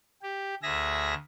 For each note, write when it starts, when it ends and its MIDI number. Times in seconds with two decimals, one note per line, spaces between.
0.22 0.55 67
0.63 1.14 38
0.63 1.14 68
0.63 1.14 76
0.63 1.14 94